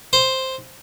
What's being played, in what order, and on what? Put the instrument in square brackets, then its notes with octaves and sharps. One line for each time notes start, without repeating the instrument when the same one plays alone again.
[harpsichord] C5